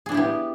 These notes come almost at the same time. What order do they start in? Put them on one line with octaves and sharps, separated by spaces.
G#4 D4 E4 G4 B3